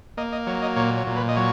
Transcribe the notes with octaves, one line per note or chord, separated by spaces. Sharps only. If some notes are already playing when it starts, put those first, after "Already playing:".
A#3 D#5
D#5
F#3 C#5
D#5
A#2 C#5
C#5
A#2
B4
D#5
F#3 C#5